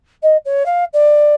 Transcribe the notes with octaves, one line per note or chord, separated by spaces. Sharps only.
D#5
C#5
F5
D5